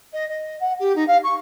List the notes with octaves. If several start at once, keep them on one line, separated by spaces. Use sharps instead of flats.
D#5
D#5
F#5
G4
D#4
F5
C#6